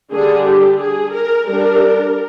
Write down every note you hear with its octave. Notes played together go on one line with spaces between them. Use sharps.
D3 G3 D4 G#4
G4
G#4
A#4
G3 D4 A#4